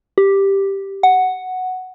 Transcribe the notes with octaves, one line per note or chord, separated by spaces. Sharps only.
G4
F#5